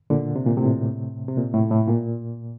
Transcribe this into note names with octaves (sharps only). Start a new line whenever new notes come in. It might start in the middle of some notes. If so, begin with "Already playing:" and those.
A#2 D3
C3
A#2
A2 C3
C3
A#2
A2
A2
A#2